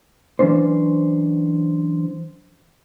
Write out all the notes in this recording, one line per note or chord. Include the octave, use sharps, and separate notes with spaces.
E3 F#3 C#4 D4 C5